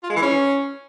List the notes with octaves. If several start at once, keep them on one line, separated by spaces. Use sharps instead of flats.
F4
G#3
E3
C#4